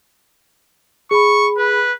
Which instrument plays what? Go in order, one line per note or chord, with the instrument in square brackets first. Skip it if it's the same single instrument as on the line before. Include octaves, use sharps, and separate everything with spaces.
[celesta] G#4 B5 [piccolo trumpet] C#6
[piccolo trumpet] B4